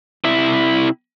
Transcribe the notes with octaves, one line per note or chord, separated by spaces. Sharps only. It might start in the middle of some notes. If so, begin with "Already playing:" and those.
C3 E4